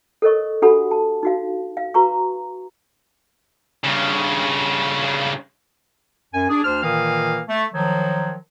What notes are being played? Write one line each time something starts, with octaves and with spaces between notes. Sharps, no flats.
A4 A#4 C#5 D#5 C#6
D4 F#4 G4 A4 F#5 B5
A5
D#4 F#4 F5
F5
F#4 B4 A#5 C#6
G2 C#3
F#2 G#5
D4 G#4
D2 D4 C5 F6
A#2 D#3 E3 A#3 F5 D#6
A3
D#3 F3 F#3